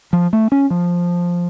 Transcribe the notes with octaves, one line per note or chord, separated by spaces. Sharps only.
F3
A3
C#4
F3